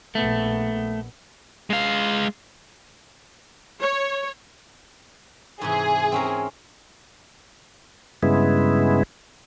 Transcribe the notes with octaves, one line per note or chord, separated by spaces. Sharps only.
A#1 A3 B3
G#3 F5
C#5
G#2 C3 E3 G#4
C4 C#4 A#4
G2 C#3 G#3 B3 E4